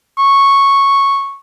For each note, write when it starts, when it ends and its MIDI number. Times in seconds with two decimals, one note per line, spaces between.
0.18 1.37 85